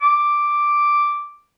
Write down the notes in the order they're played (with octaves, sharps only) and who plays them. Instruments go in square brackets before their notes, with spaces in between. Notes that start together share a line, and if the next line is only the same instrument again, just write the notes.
[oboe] D6